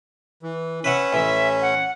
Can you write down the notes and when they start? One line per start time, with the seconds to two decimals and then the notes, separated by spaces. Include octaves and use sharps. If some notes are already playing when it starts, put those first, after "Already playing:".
0.43 E3
0.84 C#4 B4 E5 F#5
1.13 A1 E3 E5
1.62 F#5